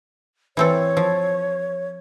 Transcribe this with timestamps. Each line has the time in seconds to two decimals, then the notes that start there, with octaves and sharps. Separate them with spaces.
0.57 E3 C4 A4 C#5
0.97 F3